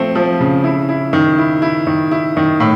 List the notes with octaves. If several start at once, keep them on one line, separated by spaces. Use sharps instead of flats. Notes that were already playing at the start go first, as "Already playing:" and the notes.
Already playing: F3 A3 C4
F3
C#3
E4
E4
D#3
E4
E4
D#3
E4
D#3
A2